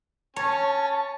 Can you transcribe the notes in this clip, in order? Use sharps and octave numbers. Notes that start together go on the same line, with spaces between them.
C#4 C#5 G#5 A5 C#6